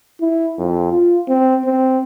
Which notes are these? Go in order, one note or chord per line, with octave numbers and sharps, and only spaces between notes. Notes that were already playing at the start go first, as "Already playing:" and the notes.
E4
F2
F4
C4
C4